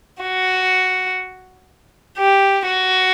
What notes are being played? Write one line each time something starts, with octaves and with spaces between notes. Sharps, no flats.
F#4
G4
F#4